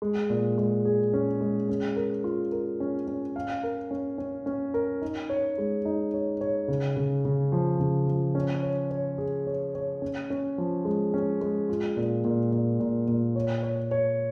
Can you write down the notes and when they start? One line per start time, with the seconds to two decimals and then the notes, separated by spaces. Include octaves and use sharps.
0.02 G#3
0.30 A#2
0.58 G#3
0.85 G#4
1.13 C#4
1.41 G#3
1.69 C#4
1.96 A#4
2.24 F4
2.52 A#4
2.80 C#4
3.07 C#4
3.36 F5
3.63 A#4
3.91 C#4
4.18 C#4
4.46 C#4
4.74 A#4
5.02 D#4
5.29 C#5
5.58 G#3
5.85 D#4
6.14 C#5
6.41 C#5
6.68 C#3
6.97 C#3
7.25 C#3
7.52 F3
7.80 C#3
8.08 F3
8.35 C#4
8.63 C#5
8.91 C#5
9.18 G#4
9.47 C#5
9.75 C#5
10.02 C#4
10.30 C#4
10.58 F3
10.85 G#3
11.14 C#4
11.41 G#3
11.69 F4
11.97 A#2
12.24 A#2
12.52 A#2
12.80 A#2
13.08 A#2
13.35 C#5
13.63 C#5
13.91 C#5